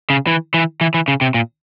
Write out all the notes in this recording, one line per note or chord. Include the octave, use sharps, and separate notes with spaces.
C#3
E3
E3
E3
E3
C#3
C3
A#2